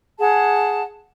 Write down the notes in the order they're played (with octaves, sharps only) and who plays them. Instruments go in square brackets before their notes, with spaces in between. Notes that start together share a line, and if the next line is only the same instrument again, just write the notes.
[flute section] G#4 F#5 A5